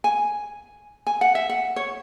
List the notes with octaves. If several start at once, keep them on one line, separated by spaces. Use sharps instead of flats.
G#5
G#5
F#5
E5
F#5
C#5